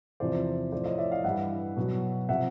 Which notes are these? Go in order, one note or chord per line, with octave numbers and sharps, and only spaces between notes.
E2 C3 F3 C5 D5
A2 F3 C5 D5
C#5 D#5
D5 E5
D#5 F5
G2 E3 G3 E5 F#5
B2 F#3
C3 F3 E5 F#5